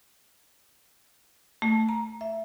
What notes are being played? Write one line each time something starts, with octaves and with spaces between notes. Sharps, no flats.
A3
A#5
E5